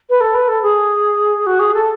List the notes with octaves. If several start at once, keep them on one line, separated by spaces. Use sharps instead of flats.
B4
A4
B4
A4
G#4
F#4
G#4
A4